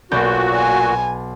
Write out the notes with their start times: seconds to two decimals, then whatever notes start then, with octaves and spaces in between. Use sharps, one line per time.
0.11 B1 A#2 F#4 D5 G6
0.56 G#5